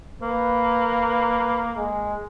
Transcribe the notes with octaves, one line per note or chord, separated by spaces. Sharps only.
A#3 B4
G#3